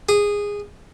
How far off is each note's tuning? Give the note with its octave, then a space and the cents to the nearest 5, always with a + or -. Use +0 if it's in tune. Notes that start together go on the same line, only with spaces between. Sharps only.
G#4 -15